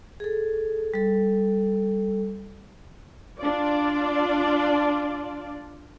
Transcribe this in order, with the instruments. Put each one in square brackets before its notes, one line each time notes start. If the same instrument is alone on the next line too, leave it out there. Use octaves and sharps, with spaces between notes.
[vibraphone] G#4 A4
G3 A4
[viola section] D4 F4 D5